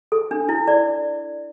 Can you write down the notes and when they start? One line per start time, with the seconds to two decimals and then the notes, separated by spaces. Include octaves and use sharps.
0.12 A4
0.31 D4
0.49 E4
0.68 D5